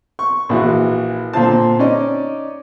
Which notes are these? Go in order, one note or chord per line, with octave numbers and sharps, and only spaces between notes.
C#6
A#1 E3 F#4
A#2 D3 C4 F4 C5 A5
C#4 D#4 D5 D#5